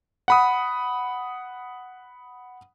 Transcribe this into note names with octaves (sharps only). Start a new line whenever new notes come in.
F#5 B5 D#6